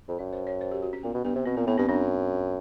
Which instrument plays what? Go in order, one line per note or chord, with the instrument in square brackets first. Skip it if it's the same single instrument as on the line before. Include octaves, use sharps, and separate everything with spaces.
[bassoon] F2
[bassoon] F#2 [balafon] D5
[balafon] C5
C#5
C5
G4
F#4
C#4
[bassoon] A#2 [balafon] B3
[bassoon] B2
[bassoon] G2 [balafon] B3
[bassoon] C3
[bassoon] B2 [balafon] C4
[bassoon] A#2 [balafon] B3
[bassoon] A2 [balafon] B3
[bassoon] G2 [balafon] C4
[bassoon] F#2 [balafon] D4